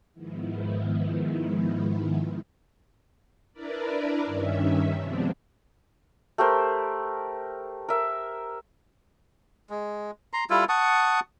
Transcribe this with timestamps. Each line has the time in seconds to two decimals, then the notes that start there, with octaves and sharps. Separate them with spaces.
0.13 G#2 D#3 F3 G#3 B3 E4
3.53 D4 E4 A#4 B4 D5
4.25 G2 D#3 C#4 E5
5.00 C3 F3 G#3 B3 C4 D4
6.38 A3 G4 A#4 C5
7.89 A#4 E5
9.70 G#3
10.33 A#5 C6
10.50 G3 E4 F4 A4
10.69 F#5 A5 C#6 D#6